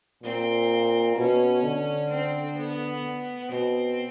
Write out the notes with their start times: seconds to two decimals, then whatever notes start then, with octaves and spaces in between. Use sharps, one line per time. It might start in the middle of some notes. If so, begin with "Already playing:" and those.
0.23 A#2 C4
1.17 B2 C#4
1.63 D3
2.10 C4
2.57 B3
3.51 B2 C4